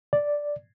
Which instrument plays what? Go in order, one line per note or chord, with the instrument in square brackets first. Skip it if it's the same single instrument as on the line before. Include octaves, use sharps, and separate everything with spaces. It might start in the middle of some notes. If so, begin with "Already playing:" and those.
[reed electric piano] D5